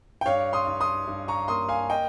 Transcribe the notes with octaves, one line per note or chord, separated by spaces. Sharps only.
G5
G2 C#5 F5
C6 D#6
G2
C6 D#6
G2
A#5 C#6
A#3 C6 D#6
F5 G#5
D#5 G5